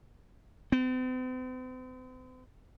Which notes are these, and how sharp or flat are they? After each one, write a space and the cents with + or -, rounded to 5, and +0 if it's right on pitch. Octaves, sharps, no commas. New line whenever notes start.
C4 -45